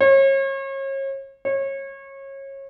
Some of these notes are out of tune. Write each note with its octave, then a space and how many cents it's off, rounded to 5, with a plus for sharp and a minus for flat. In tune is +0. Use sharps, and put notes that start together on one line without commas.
C#5 -35
C#5 -25